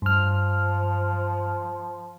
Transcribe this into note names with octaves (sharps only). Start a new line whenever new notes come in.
G2 F3 F6